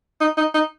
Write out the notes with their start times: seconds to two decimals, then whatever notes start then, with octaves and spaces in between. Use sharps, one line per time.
0.21 D#4
0.37 D#4
0.54 D#4